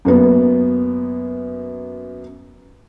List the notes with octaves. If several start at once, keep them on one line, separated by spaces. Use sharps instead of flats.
F#2 A#3 B3